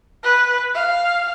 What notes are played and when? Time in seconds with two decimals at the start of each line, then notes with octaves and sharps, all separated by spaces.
0.23 B4
0.74 F5